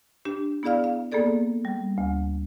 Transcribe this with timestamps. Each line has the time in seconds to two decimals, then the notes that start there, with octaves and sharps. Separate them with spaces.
0.25 D4 G4
0.63 B3 E4 G#4 D5 F5 F6
0.84 F5
1.12 A#3 B3 G#4 A4 D5
1.65 G3
1.98 D2